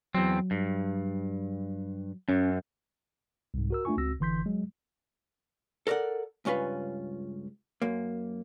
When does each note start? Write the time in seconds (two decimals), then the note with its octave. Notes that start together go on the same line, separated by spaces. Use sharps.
0.15 E2 F#3 C4
0.51 G2
2.29 F#2 C#4
3.54 C2 G#2
3.70 F#4 A#4 E6
3.85 A3 D4 F4 G#5 C#6
3.97 C#2 C4 F#4 E6 A#6
4.19 G1 D3 E3 C6 G6 B6
4.46 F#3 G#3
5.87 A4 A#4 C#5 D5 F#5
6.45 C#2 G2 C#4 F4 B4
7.82 F#2 A#3